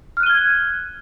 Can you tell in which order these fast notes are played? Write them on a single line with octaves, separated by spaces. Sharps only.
F6 F#6 D#7 G7 G#6